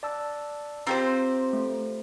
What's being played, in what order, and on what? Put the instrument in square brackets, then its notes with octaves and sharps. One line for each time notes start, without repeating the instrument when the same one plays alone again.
[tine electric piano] D5 A5 E6
[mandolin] C4 [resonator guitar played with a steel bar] F4 G4 C5 [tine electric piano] A#5
[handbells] A3